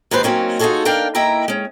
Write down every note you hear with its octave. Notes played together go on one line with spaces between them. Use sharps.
D#2 G#2 D#3 D#4 B4 C5
F#3 A#3 C4 C#4 D#4
D#4 F4 F#4 G#4 A4 C#5
D4 A#4 D5 F5 G5
A#3 E4 D#5 E5 G5 A#5
G#3 C#4